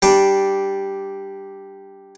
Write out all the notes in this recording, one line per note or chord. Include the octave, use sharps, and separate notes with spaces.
G3 D4